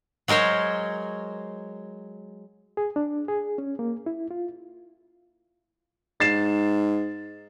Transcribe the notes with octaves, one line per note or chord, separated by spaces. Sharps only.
F#3 G#3 A#4 C5 C#5
G#4
D4
G#4
C#4
A#3
E4
F4
G#2 A6 C7 E7